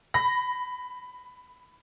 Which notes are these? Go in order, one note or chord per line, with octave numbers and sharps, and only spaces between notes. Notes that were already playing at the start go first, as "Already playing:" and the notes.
B5 A#6